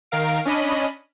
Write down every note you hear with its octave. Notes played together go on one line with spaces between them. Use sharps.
D#3 A#4 F5 D7
C#4 D4 D#5 B5 D#7